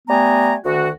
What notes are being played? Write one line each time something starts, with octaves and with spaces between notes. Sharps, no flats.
G3 A3 B3 G#5 A#5
D2 D#3 F#4